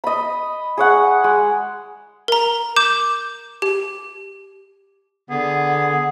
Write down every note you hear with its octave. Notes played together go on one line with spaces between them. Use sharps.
D#5 B5
G#4 C#5 F#5
G#3
A#4 A#5
D6 G6 E7
G4
D3 B3 G#4